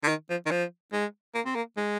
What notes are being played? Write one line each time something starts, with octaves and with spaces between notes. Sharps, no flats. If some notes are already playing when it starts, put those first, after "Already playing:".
D3
D#3
F3
D#3
F3
G#3
A#3
C4
A#3
G#3